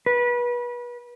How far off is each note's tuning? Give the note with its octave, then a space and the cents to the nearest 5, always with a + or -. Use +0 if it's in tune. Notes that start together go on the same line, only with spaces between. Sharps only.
B4 -30